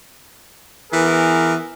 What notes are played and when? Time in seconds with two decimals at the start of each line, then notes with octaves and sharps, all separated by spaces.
0.92 E3 B3 G#4 A#4